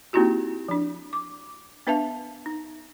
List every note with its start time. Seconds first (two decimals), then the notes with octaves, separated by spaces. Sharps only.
0.13 A#3 C4 D#4 E4 F#4 G4
0.68 F3 D4
1.13 D6
1.87 B3 D4 B4 E5 F5 A5
2.46 D#4